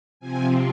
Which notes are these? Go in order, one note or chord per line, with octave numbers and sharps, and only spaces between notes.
C3 F3 C4 G#5